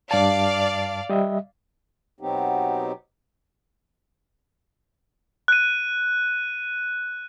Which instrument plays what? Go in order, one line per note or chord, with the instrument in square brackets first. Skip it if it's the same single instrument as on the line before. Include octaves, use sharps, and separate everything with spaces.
[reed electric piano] G2 A5 [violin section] D5 F5
[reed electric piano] G3 D#5 E5
[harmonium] B2 F#3 B3 C4 D#4 G4
[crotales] F#6 D#7